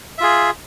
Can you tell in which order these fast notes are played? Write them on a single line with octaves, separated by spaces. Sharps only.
E5 F4 G#4